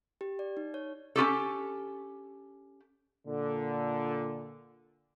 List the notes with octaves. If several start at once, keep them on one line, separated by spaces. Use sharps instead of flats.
G4
D5
D#4
C#5
C#4 F4 G4 A4
A#2 D3